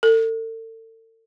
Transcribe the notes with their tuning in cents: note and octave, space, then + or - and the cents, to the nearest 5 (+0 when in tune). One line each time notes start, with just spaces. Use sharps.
A4 +40